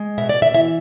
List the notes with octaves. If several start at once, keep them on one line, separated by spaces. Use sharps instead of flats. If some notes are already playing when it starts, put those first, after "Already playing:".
Already playing: G#3
B2 E5
D5
E5
E3 E5